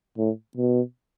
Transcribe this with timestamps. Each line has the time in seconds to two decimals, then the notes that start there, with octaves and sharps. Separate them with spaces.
0.18 A2
0.57 B2